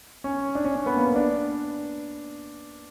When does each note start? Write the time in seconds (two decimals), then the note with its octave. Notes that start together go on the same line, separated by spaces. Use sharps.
0.24 C#4
0.55 D4
0.65 C#4
0.76 C#4
0.86 B3
0.96 A#3
1.06 B3
1.16 D4